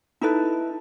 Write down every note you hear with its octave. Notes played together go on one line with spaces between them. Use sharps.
D#4 E4 A4 B4